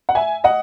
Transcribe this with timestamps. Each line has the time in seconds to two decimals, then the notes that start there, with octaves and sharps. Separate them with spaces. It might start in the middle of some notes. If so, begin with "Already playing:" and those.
0.09 F#5
0.15 E5 G#5
0.44 D#5 F#5